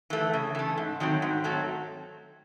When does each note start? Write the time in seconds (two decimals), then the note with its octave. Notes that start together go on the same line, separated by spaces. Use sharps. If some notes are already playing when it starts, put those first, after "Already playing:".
0.10 E3 A3
0.34 C#3
0.55 E3 A3
0.78 G#2
1.00 D#3 F#3 A3 C4
1.22 G#2
1.44 D#3 F#3 A3 C4